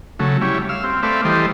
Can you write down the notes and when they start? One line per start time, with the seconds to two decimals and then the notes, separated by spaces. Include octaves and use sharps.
0.19 C#3 F#3 A3
0.41 G3 C#4 E4
0.69 F5 E6
0.84 C4
1.03 A3 C4 B4 D5 E5 F5
1.25 E3 G3 A4 C5 D#5